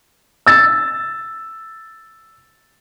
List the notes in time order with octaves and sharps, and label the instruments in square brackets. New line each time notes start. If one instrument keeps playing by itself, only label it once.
[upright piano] E6 A6